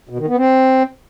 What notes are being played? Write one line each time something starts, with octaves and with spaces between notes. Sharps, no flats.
B2
D#3
B3
C4